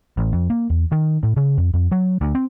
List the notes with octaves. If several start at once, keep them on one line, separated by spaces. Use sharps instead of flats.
A1
F2
A#3
E2
D#3
A2
C#3
F2
F2
F#3
D2
C4